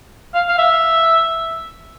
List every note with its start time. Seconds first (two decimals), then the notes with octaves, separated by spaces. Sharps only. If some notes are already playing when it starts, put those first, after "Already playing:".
0.34 F5
0.49 F5
0.58 E5